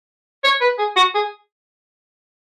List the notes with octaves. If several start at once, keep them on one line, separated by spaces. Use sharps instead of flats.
C#5
B4
G#4
F#4
G#4